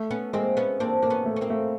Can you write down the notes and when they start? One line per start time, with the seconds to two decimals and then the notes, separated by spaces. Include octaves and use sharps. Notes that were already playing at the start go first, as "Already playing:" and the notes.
Already playing: A3
0.11 B3 C#4
0.33 G#3 A#3 C4
0.57 B3 C#4
0.80 A#3 C4 D4
1.02 A#3 D4
1.10 B3 C#4
1.25 A3
1.36 C#4
1.41 A#3 C4
1.50 A3